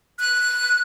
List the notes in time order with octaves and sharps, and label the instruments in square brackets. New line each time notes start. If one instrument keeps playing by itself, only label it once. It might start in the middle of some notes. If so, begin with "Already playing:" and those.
[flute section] F#6